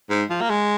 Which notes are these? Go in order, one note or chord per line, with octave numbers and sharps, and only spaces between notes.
G#2
F3
A#3
G#3